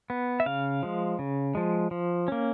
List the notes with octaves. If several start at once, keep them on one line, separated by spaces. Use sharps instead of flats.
B3
E5
C#3 F5
F3 G#3
C#3
F3 G#3
F3
A#3 C#4